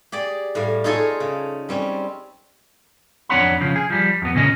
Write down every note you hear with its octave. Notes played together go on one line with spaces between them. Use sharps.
G4 G#4 D5
A2 G3 F5
D#4 F4 G#4 A4 C#5 G#5
C#3
G3 C4 C#4
F2 D4 C#5 F#5 B5
C#3 F3
G#4
F3 G3
F2 B3
A#2 C#3 C#4 D#5